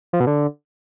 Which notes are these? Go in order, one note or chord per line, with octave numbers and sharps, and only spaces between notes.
F3
B2
D3